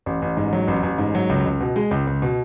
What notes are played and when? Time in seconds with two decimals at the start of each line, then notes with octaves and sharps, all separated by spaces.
0.06 A1
0.22 A1
0.37 G#2
0.53 F#3
0.68 A1
0.83 A1
0.98 G#2
1.15 F#3
1.29 C#2
1.46 C#2
1.61 B2
1.76 G#3
1.91 C#2
2.07 C#2
2.22 B2